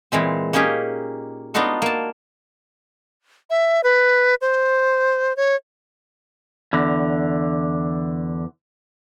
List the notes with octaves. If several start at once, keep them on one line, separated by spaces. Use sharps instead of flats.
A#2 E3 G#3 C4
A#3 C#4 D#4 G4 G#4
B3 D4 D#4 F4 F#4 A4
A#3 A5
E5
B4
C5
C#5
E2 D3